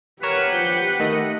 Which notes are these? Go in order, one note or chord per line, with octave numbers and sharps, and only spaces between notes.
G4 A#4 B4 C#5 F#5 E7
F3 G6
D#3 A3 D#5